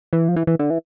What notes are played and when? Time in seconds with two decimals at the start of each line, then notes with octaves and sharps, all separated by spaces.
0.13 E3
0.29 F3
0.36 E3
0.47 E3
0.59 D3
0.70 E3